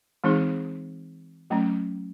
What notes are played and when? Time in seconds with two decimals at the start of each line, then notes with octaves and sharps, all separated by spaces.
0.24 E3 G#3 C4 D#4 G#4
1.50 F#3 A3 C#4